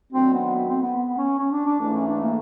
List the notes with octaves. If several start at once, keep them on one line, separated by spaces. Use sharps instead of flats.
D#3 F#3 A3 C4 D4 F#4
B3
B3
C4
B3
B3
C#4
C#4
D4
D4
G#2 E3 A3 D4
C#4
D4
A#3